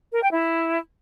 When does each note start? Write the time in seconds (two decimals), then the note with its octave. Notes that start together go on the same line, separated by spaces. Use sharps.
0.13 A#4
0.22 G5
0.31 E4